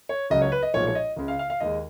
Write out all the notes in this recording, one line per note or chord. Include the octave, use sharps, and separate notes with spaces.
C#5
C#2 C#3 F#3 D#5
C#5
B4
D#5
B1 A#2 F3 G#3 C#5
C#5
D#5
C#2 C#3 G#3
F5
F5
F5
D#2 D#3 G#3 D#5